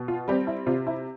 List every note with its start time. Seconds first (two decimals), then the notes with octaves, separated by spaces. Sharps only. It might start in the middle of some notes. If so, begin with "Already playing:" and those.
Already playing: B2
0.08 F4
0.28 G3 C4 G4
0.47 E4
0.67 C3 F4
0.87 E4